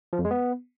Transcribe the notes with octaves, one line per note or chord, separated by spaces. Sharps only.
F3
F2
G#3
B3